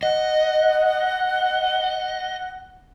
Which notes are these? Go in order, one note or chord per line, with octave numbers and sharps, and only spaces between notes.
D#5 F#5